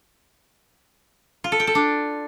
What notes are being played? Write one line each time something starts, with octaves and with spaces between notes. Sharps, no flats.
F4
A4
G5
A4
D4